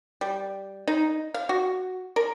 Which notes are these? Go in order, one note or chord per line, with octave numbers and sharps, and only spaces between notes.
G3
D#4
F5
F#4
A#4